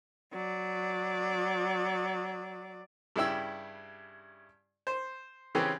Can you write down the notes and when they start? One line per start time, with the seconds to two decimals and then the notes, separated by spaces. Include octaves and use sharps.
0.33 F#3 D5
3.16 G2 C#3 E4 G4 E6
4.87 C5
5.55 C#3 E3 C4 C#4 G4